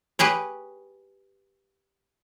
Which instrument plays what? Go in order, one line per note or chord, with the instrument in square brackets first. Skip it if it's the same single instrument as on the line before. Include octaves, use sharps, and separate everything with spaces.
[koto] G4 G#4 B4 C#5